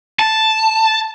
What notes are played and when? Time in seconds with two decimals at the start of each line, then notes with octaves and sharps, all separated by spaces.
0.19 A5